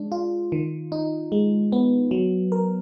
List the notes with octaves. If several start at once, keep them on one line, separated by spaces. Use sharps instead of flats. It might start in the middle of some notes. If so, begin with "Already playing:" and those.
Already playing: G#3 D4
F4
D#3
D#4
G#3
B3
F#3
A#4